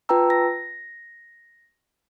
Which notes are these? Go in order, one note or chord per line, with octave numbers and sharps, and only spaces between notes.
F4 B4 G5 A5 A#5 E6
A#6